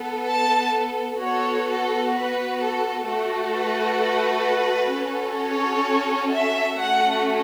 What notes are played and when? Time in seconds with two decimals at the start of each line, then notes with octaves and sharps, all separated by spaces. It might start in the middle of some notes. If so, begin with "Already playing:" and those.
Already playing: B3 A4
0.29 A5
1.21 B3 F#4 A4 C#5
1.68 A4
2.15 B4
2.61 A4
3.07 A3 F#4 A4
3.54 B4
4.00 B4
4.93 C#4 F#4 A4
5.40 C#5
6.33 E5
6.79 A3 C#4 F#4 A4 F#5